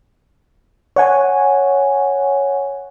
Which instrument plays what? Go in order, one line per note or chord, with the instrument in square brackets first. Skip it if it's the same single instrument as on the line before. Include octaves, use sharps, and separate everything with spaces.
[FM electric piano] C#5 F#5 G#5